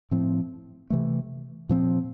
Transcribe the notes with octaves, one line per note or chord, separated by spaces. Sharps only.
A2 F3 C4
C3 E3 A3
A#2 F3 C4